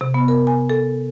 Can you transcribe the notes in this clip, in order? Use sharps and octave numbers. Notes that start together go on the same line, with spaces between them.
C3
B3
A#4
G#5
A4